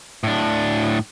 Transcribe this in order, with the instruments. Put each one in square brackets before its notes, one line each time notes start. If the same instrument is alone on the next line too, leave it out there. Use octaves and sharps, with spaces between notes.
[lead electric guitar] A2 D4